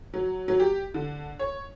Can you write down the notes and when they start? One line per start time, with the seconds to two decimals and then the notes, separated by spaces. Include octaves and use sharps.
0.14 F#3
0.48 F#3
0.60 G4
0.94 D3
1.39 C#5